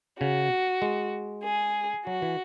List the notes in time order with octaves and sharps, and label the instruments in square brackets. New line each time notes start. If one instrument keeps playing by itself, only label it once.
[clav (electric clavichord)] C#3 [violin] F#4
[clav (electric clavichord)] G#3
[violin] G#4
[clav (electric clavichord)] F#3 [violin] F#4
[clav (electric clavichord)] E3